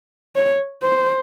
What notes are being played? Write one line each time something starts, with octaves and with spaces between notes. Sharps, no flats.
C#5
C5